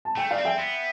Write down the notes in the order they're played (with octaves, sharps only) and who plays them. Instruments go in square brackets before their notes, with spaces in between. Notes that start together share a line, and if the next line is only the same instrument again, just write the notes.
[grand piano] A5
[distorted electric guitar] A3 [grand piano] G5
[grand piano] D5 F5
[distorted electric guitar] C4
[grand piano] E5 G5
[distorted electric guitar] B3